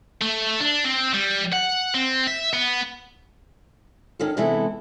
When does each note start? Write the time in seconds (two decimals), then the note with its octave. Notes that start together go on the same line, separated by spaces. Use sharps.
0.21 A3
0.60 D4
0.84 C4
1.14 G3
1.53 F#5
1.95 C4
2.27 E5
2.53 B3
4.19 D#3 C#4 A4
4.37 C3 E3 G#3 B3 E4 A4